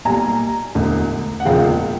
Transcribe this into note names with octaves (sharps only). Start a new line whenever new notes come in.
B1 A#2 G3 A#3 G#5 A#5
E1 D2 D3
F#5
E1 D#2 C#3 F3 G#3 F5 G5